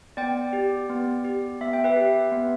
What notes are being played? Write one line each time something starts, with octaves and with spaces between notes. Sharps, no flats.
B3 D5 G5
G4
B3
G4
B3 E5
G5
B4 E5
G4
B3